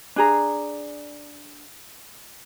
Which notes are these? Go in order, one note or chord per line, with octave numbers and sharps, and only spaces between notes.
D4 G#4 A#5